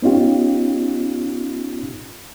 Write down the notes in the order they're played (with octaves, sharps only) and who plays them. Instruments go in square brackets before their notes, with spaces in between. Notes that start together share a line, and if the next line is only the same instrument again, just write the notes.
[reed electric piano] B3 C#4 D#4 F4 G4